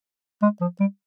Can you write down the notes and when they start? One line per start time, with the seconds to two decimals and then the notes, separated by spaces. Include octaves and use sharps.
0.42 G#3
0.61 F3
0.80 G3